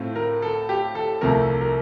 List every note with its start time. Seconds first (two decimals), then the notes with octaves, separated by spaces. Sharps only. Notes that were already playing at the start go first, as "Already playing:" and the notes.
Already playing: A2 A3 C4 F4
0.15 A#4
0.42 A4
0.69 G4
0.95 A4
1.21 C2 C3 F3 A3 A#4
1.61 A#4